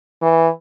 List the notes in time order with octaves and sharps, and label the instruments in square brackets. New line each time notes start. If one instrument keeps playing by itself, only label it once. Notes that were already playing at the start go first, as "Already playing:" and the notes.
[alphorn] E3